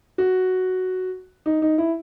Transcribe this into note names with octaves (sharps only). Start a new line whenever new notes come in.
F#4
D#4
D#4
E4